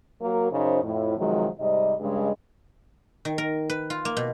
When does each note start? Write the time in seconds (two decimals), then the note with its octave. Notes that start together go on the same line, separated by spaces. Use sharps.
0.21 F#3 A#3 F#4 A#4
0.52 F#2 C#3 D#4 C5
0.83 F2 A2
1.17 C3 D#3 F3 F#3 G#3
1.59 G#2 C3 G3 D#5
2.00 G2 C#3 G#3
3.25 D#3
3.38 A#4
3.70 B4
3.90 F4
4.05 A#3
4.17 B2